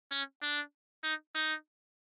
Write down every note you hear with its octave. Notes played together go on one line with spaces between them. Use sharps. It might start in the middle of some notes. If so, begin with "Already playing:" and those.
C#4
D4
D#4
D#4